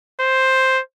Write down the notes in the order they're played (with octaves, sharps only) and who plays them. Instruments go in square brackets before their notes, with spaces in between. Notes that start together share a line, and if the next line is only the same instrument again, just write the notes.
[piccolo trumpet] C5